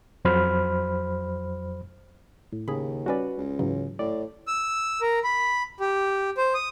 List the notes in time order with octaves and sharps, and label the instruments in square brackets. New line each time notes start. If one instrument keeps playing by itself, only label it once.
[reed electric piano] F2 F#3 C5 B5 F6
[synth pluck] A2
[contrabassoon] D#2 [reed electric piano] C#3 [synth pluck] G#4 B5
[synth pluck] G3 C#4 D5 [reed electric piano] F#4 B4
[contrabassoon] C#2
[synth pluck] G#2 E3 F#3 [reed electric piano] C#3
[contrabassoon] A2 [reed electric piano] D5
[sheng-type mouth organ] E6
A#4
B5
G4
C5
D#6